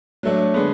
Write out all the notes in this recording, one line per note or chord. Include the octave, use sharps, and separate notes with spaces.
F#3 A3 D4
D3 G#3 B3